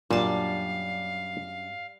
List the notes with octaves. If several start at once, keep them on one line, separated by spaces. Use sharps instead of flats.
F#2 A#2 G3 D4 F5 A5